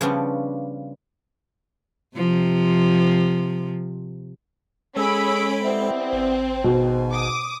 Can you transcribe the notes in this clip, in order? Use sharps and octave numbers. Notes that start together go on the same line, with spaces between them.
C#3 F3 G3 B3 C#4 D4
C3 F3
G#3 C#4 G#4 A4 B5 E6 D7
G3 B3 C4 E4
G#1
G#2 B2
D6 D#6